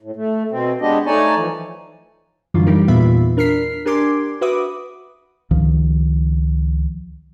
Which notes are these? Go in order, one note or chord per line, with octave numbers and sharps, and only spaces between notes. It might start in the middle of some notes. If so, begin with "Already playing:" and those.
A2
A3
B2 C4
G#3 B3 D4 G4 D#5
A3 D#4 C#5 D5 G#5 A5
E3 F3
F#2 D3 E3 F#3 G3 F4
G3 D#4 G4 A#4
E2 A#2 B3 F4 E5 B5
D4 A#4 F6 B6 C7
D4 G4 A#4 G#5 C6 D6
F#4 B4 E5 D6 D#6
C#2 D#3 F3